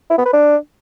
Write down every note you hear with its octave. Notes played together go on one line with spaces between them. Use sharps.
E4
B3
B4
D4